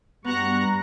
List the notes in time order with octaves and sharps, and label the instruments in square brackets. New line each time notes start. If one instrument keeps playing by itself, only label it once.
[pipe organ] G2 G3 C#6 [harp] B3 F#4 [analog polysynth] A#5 F#6 A#6